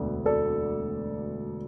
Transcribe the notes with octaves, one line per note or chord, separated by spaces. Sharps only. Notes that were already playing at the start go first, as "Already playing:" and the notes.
Already playing: E1 D2 D3 B3 A4 D5
A4 D5